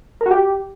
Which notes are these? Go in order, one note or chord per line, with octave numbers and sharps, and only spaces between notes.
A#4
F#4
G4